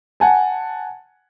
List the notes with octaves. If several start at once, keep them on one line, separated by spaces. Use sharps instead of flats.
F#5 G#5 A5